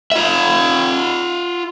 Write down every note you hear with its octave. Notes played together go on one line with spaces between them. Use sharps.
F4 E5